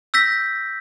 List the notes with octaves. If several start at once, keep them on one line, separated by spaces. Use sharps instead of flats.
E6 G6 A#6 B6